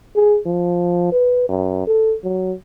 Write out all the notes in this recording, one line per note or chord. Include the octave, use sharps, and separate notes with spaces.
G#4
F3
B4
F#2
A4
F#3